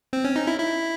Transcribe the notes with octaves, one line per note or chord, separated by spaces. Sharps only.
C4
C#4
D#4
E4
E4